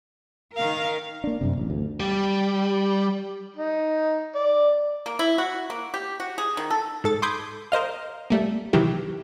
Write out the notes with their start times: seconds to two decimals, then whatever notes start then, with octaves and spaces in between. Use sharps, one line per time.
0.57 D#3 A#4 F5
1.24 A#3 D4
1.41 F#2 A2 C3
1.58 A1
1.70 D2
2.00 G3
3.56 D#4
4.35 D5
5.06 A#3
5.19 E4
5.38 F#4
5.70 A#3
5.94 G4
6.20 F#4
6.38 G#4
6.57 D#3
6.70 A4
7.04 G#2 A4 A6
7.22 B5 C6 D6 D#6 G6 G#6
7.72 A#4 C5 D#5 F5
8.30 G3 A3 A#3
8.73 C3 D#3 E3 F#3 E4 G4